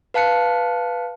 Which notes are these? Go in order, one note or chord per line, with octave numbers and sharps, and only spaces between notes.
B4 F5 A5 F#6 C#7